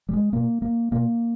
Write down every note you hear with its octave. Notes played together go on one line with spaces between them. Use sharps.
G3
G#3
B2 A#3
A#3
B2 A#3